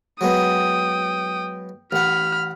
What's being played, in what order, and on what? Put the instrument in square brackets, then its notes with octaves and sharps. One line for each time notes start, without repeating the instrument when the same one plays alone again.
[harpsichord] F#3 G#3 B3 [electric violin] G5 D#6
[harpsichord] A1 F#5 [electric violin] B5 F6